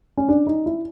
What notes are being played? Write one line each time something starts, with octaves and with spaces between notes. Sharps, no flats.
C#4
D4
D#4
E4